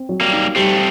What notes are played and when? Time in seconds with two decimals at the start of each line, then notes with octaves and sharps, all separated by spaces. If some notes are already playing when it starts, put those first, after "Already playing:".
Already playing: C4
0.09 F#3
0.21 G3 A#3
0.33 D#4
0.56 G3 A3 C4